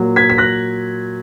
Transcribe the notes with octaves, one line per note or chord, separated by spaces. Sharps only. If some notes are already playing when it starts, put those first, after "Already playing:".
Already playing: A#2 F#3
G#6 B6
B6
F#6 A#6